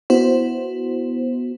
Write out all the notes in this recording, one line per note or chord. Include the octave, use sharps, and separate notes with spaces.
B3 E4 F#4 C5